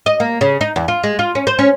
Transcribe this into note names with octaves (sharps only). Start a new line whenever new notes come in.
D#5
A#3
C#3
D#4
E2
F4
G#3
F4
C#4
C5
C#4